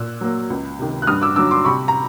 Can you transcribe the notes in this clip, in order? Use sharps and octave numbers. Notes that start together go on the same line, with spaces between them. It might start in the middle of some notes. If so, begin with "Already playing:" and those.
Already playing: A#2 E6 F#6
F#3 A#3
C#2
C3 D#3
F#6
G2 D#6 F6
D6 E6
D3 F#3 D6 E6
C6 D6
C3 B5 C#6
A#5